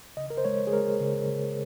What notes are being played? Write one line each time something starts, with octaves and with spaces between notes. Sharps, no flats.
C#3 D#5
A#4
C5
G#3 C#5
G#4
G#3 A#4
C#3
C#3